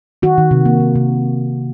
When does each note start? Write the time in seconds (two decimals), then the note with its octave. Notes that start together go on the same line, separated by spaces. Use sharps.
0.22 D#3 F#4
0.38 D#3
0.51 C3
0.65 A#3
0.80 D#3
0.95 C3